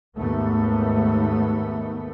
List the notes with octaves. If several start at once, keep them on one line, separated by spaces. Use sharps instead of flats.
D#2 G#2 A3 B3